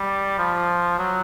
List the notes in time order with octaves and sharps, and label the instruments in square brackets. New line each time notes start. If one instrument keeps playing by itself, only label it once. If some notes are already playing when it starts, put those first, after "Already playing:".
Already playing: [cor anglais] G3
F3
F#3